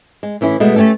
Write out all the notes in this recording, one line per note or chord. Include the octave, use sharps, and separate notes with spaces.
G#3
A2 E3 C#4 E4
B2 G#3 A3 B3
A3 A#3 C#4 G4 A4